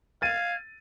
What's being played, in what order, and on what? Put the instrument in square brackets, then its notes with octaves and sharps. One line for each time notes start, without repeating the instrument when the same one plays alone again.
[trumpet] F5 [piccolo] G#6 [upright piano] A6 D#7